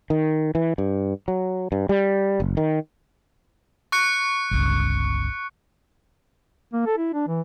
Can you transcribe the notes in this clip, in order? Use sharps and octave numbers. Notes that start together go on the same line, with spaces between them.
D#3
E3
G2
F#3
G2
G3
F#1
D#3
C#6 F#6 C#7
G1 C#2
A#3
A4
E4
D4
E3